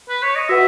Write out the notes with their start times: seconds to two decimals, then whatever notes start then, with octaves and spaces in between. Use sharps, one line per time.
0.09 B4
0.23 C#5
0.36 D#5
0.49 F#4 B4 E5 F#5